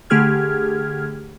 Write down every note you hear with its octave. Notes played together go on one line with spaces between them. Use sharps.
D3 A3 G4 G#4 F6 G#6